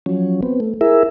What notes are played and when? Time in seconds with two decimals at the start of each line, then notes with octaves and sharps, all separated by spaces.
0.06 F3 F#3 C#4
0.43 B3 C4
0.60 A3
0.81 E4 G#4 A#4 E5